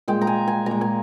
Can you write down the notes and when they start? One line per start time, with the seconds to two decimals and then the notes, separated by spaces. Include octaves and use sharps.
0.08 A#2 G#3 G5
0.21 A#5
0.27 G#5
0.48 G#5
0.66 A#2 G#3 A#5
0.81 G#5